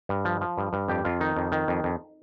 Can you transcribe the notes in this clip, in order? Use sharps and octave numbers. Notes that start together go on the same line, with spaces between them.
G2
F3
F3
G2
G2
F2 G4
F2 F4
D#3 D#4
F2
D#3
F2
F2